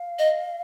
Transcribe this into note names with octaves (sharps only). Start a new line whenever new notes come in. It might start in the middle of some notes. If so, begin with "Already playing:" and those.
Already playing: F5
D#5